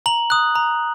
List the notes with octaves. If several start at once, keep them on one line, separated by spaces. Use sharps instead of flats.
A#5 F#7
D#6 F#6
A#5